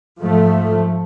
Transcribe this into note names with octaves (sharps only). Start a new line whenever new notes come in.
G#2 F3 A3